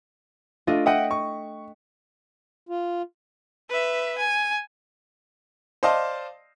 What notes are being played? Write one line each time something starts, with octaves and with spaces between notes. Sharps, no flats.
A3 D4 F4 D#5
D#5 E5 F#5 G5 D#6
C#6
F4
B4 E5
G#5
C5 D5 D#5 F5 A5